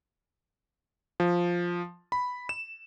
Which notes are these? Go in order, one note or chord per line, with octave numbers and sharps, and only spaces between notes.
F3
B5
E7